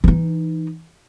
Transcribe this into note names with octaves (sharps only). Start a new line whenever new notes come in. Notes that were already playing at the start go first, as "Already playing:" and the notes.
E3 D#4